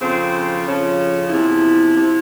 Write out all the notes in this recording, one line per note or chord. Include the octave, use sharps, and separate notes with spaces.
F2 C#3 F3 C4
F2 C#3 F3 C#4
E2 C3 F3 E4
C3 F3